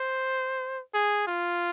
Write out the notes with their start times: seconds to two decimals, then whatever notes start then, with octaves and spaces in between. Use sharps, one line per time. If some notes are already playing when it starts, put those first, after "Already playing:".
Already playing: C5
0.94 G#4
1.27 F4